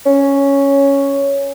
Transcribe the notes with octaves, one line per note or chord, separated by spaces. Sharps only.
C#4